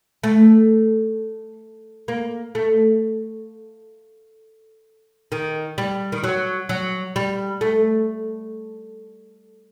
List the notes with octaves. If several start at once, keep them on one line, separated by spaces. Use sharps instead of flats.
A3
A#3
A3
D#3
G3
D#3
F#3
F#3
G3
A3